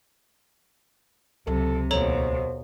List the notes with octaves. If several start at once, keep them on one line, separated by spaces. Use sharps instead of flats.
C#2 C3 F#3 A4
D#2 B2 A4 C5 C#5 A#5